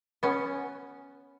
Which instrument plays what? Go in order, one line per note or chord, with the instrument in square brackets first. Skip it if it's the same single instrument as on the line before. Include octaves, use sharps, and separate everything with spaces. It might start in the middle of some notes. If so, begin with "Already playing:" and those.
[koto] B3 C#4